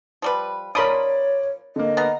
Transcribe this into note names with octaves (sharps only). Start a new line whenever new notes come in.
F3 G3 B4
F3 A#4 C#5 D5 B5 C6 D#6 D7
D3 A#3 D#5
B3 F5 A#5